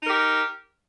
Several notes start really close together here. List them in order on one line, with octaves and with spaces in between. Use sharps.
D#4 A#4 G4